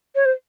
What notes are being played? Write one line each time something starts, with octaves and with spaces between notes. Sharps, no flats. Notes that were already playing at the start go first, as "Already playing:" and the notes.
C#5
C5